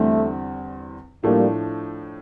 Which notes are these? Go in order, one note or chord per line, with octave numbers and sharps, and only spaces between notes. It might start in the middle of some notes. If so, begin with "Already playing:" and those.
Already playing: E2 D3 G3 A3 C4
A2 F3 G3 A3 A#3 D4